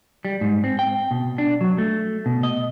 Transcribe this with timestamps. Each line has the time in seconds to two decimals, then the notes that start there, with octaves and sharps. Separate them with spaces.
0.25 G3
0.41 G#2
0.64 C4
0.79 G5
1.11 B2
1.38 D4
1.61 F#3
1.78 A3
2.26 B2
2.43 D#5